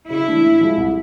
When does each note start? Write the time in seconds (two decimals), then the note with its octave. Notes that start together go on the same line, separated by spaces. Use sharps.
0.10 C#3 E4
0.28 E3 A3 D4
0.44 A2
0.61 F3 G#3
0.77 C2